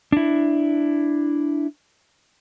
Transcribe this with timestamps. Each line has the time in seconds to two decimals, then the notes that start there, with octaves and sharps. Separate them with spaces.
0.12 D4 E4